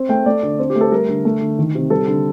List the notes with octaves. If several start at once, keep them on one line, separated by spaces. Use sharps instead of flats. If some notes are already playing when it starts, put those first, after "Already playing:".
Already playing: C4
A3 G5
A3 D5
D3
C4
G4
A3
A4
G3 A#4
D3
A3
D3
D#3
C3
G3 A4
D3